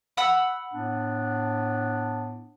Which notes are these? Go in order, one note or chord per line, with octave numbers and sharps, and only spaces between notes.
F#5 B5 E6
A2 B3 D4